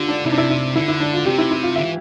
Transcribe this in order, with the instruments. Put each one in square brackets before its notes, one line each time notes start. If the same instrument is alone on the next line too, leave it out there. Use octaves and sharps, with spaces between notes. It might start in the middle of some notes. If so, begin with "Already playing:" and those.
Already playing: [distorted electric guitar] D3 [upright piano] F4 G4
[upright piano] D4
[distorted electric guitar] C3 [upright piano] E4
[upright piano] D4
E4
E4
[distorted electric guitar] D3 [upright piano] E4
[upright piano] E4
D4
F4
[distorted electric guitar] C3 [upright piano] G4
[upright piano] E4
E4
F4
[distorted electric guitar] D3 [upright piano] E5
[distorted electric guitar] E3